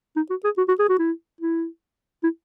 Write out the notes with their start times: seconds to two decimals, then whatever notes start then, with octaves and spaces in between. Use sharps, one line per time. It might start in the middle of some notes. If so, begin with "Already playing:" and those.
0.16 D#4
0.30 F#4
0.44 G#4
0.57 F#4
0.68 F#4
0.79 G#4
0.89 F#4
0.99 E4
1.41 E4
2.23 E4